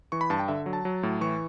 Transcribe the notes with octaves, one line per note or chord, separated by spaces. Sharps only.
E3 C#6
B5
G2 A5
G5
D3 E5
F#3
A5
F#3
A2
E3 C#6